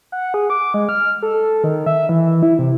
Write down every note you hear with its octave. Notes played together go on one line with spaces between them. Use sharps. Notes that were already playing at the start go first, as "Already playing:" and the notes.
F#5
G#4
D6
G#3
F6
A4
A4
D#3
E5
E3
E4
C3